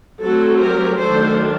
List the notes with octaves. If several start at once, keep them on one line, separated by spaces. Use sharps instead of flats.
F#3 A3 C4 F#4 A4
G4 A#4
D#3 F#3 A3 D4 A4 C5